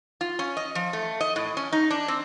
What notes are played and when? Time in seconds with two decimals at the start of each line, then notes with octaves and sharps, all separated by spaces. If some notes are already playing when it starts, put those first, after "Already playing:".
0.21 F4
0.39 C#4
0.57 D#5
0.75 F3
0.93 A3
1.21 D#5
1.36 A2
1.57 C#4
1.72 D#4
1.90 D4
2.08 C4